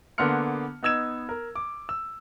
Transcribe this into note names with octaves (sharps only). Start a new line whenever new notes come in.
D3 A#3 B3 C6 F6 C#7
B3 D#4 E6 G#6 E7
A#4
D6
E6